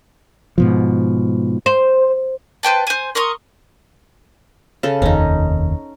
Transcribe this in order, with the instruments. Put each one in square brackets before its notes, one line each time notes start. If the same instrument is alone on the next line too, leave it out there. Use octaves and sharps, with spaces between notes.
[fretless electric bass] G#2 B2 F3
[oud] C5
[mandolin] B4 C5 G5 A5
C5 G#5
A#4 C6 C#6 D#6
[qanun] C#3 A4
[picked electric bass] F1 D#2 [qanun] C#4 D#4